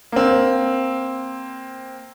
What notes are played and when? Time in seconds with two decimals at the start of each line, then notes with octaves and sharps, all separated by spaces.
0.12 A#3 C4